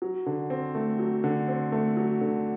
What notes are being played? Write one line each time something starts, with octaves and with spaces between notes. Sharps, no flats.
F#3
D3
C4
A3
F#3
D3
C4
A3
F#3
D3